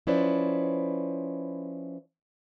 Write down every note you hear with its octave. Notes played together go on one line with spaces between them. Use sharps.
F3 C#4 E4 B4 C5 D5